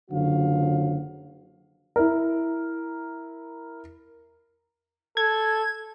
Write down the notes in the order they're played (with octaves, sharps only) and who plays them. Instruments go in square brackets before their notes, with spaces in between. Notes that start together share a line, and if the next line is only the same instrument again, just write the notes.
[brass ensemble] F#1 D3 F3 F#3 F#4 F5
[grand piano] E4 A#4
[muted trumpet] A4 [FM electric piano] G#6